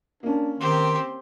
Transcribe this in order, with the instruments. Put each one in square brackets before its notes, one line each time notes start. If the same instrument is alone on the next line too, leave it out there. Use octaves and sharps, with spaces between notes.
[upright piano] A#3 C#4 [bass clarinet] D4
[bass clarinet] D#3 [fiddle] C4 G4 [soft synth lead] C6